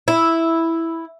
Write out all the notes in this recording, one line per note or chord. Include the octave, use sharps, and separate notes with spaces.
E4